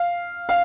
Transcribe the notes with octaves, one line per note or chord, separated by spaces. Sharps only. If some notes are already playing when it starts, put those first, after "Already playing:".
Already playing: F5
F5